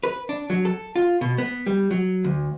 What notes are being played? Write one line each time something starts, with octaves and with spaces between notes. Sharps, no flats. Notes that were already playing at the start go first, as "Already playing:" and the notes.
B4
D4
F#3
A4
F4
B2
B3
G3
F#3
D2